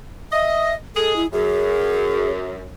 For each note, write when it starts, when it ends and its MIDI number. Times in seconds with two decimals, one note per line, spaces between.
0.32 0.73 75
0.32 0.74 76
0.95 1.21 56
0.95 1.21 68
0.95 1.14 69
1.16 1.26 64
1.33 2.74 42
1.33 2.31 68